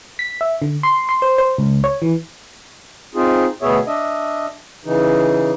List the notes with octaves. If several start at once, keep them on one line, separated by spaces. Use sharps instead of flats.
B6
E5
D3
C6
C6
C5
C5
C#2
C#5
E3
C4 D#4 F4 G#4
D2 B2 B3 G#4 C#5 E5
D4 D#5 E5
C#3 E3 D#4